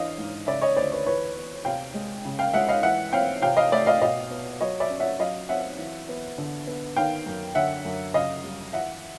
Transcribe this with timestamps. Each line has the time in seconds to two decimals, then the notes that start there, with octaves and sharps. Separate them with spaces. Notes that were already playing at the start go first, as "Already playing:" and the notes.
Already playing: E3 D4 D#5 F5
0.18 G#2
0.47 C#3 D5 E5
0.61 C#5 D#5
0.77 D2 C5 D5
0.92 B4 C#5
1.06 E3 B4 C#5
1.36 B3
1.65 C3 F5 G5
1.94 G#3
2.25 C#3
2.39 F5 G5
2.54 G#3 E5 F#5
2.69 D#5 F5
2.83 E3 E5 F#5
3.13 C4 F5 G5
3.42 C3 F5 G5
3.57 D#5 F5
3.72 A3 D5 E5
3.86 D#5 F5
4.02 B2 D#5 F5
4.30 B3
4.61 F#3 C#5 D#5
4.80 D5 E5
4.90 C#4
5.00 E5 F#5
5.20 F#3 D#5 F5
5.49 C4 E5 F#5
5.78 E3
6.08 B3
6.38 D3
6.67 B3
6.96 D#3 F5 G5
7.26 F#2
7.55 D3 E5 F#5
7.85 F#2
8.14 C#3 D#5 F5
8.44 G3
8.73 E3 E5 F#5